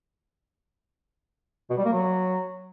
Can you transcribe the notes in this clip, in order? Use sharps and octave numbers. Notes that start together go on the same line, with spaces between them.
B2
G3
A#3
F#3